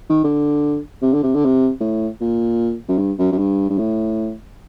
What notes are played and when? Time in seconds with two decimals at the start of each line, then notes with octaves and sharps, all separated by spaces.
0.10 D#3
0.24 D3
1.02 C3
1.13 D3
1.23 C3
1.35 D3
1.45 C3
1.80 A2
2.21 A#2
2.89 F#2
2.98 G2
3.19 F#2
3.32 F#2
3.39 G2
3.70 G2
3.78 A2